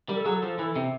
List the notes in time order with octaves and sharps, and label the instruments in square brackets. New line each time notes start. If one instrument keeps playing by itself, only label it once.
[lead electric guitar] G3 [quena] A#4
[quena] A4
[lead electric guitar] F#3 [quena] G#4
[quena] A4
[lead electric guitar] F3
E3
C3